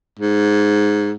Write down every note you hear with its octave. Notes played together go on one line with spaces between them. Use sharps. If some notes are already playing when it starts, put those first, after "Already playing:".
G#2